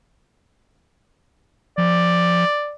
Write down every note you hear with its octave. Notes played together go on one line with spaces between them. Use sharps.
F3 D5